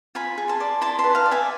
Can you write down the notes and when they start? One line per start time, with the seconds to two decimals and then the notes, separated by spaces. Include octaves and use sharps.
0.15 F4 G#5 B5
0.38 G#4
0.48 A5 C6
0.60 D5
0.81 E4 A5 C6
0.98 A5 C6
1.04 B4
1.15 F5 A5
1.26 D5
1.31 E5 G#5